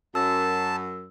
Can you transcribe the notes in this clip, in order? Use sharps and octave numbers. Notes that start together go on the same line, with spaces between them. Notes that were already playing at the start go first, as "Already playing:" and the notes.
F#2 A5 E6